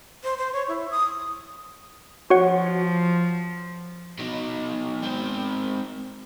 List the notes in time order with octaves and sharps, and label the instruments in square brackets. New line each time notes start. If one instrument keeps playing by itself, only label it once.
[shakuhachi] C5
C5
C#5
E4
D#6
[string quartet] F3 [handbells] F#4 C#5 F#5
[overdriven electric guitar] B2 D#4
G#2 C4